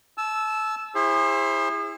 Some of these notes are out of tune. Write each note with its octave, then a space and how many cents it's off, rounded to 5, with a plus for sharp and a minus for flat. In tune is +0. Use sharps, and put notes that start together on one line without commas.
A5 -35 E6 +0
E4 +0 G#4 -35 C5 +25